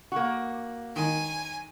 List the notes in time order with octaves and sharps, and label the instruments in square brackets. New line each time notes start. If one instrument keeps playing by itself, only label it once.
[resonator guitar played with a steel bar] A#3 F#4
[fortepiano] D#3 [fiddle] G#5